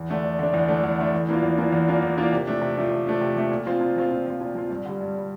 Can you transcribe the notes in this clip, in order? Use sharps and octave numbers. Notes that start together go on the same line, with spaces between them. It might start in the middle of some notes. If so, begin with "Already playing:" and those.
Already playing: E2
D3 A3 D4
E2
D3 A3 D4
E2
D3 A3 D4
E2
D3 A3 D4
E2
E3 A#3 D4 F4
E2
E3 A#3 D4 F4
E2
E3 A#3 D4 F4
E2
E3 A#3 D4 F4
C3
F3 A3 D4
C3
F3 A3 D4
C3
F3 A3 D4
C3
F3 A3 D4
A#2
F3 C4 F4
A#2
F3 C4 F4
A#2
F3 C4 F4
A#2
F3 C4 F4
G2
D3 G3
G2
D3 G3